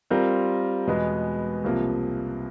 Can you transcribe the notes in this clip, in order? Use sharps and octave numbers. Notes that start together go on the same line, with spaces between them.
G3 C4 F4 A#4
E2 B2 G#3 B3
C2 C3 F3 A#3